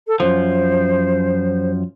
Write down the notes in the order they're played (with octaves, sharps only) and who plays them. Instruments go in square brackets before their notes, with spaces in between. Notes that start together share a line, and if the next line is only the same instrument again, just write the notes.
[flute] A4
[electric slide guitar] F#2 F3 [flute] C5